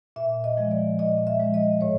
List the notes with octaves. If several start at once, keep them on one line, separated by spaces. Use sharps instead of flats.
A#2 E5
D#5
F3 G#3
D5
A#2 D#5
E5
F3 G#3
D#5
A2 C#5